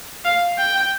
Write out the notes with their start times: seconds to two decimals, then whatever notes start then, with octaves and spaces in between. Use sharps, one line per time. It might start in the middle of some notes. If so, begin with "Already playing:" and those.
0.25 F5
0.58 G5